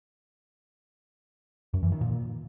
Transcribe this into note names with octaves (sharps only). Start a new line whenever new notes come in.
F#2
E3
D#3
A#2